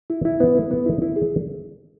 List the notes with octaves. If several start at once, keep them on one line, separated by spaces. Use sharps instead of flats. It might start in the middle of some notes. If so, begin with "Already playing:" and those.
E4
E4
B3
E4
B3
E4
E4
G#4